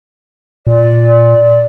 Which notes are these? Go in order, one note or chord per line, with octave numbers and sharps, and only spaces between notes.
A#2 D5